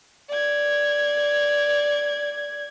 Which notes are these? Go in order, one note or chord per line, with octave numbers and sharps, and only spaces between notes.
D5 G#6